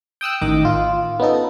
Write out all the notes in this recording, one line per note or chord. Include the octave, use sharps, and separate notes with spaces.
G5 D#6 E6 F#6
A1 D#3 D#5 D6
F4
B3 C#4 D#4 A4